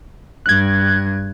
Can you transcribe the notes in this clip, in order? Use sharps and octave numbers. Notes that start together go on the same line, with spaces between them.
G2 F#6 G#6